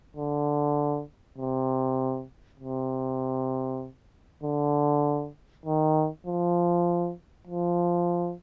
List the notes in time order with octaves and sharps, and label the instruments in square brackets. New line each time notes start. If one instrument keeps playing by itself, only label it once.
[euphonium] D3
C3
C3
D3
D#3
F3
F3